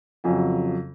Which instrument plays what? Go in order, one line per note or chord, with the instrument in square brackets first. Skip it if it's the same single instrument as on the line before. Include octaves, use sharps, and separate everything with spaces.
[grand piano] F2 C#3 F#3 G#5